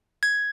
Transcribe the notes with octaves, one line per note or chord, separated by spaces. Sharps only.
G#6